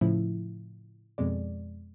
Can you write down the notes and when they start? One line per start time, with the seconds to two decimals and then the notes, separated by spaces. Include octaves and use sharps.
0.01 A2 C#3 F3 E4
1.18 F2 B2 G#3 D5